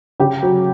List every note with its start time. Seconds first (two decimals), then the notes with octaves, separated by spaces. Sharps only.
0.20 C#3 G4
0.43 F#3